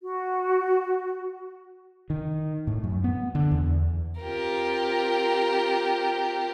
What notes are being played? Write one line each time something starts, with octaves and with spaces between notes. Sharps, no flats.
F#4
D#3
A2
F#2
B3
D3
E2
C4 F4 G4 A#4